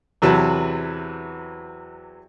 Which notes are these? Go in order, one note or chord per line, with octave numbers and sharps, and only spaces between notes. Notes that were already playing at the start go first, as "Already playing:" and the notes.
E2 C3 E3 F#3 B4 A5